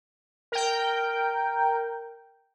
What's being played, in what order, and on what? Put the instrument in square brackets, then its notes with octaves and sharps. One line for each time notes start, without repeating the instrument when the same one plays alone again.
[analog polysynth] A#4 G5